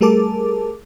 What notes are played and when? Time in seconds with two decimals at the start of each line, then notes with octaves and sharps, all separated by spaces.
0.01 G3 A3 G#4 A#4 A5 D6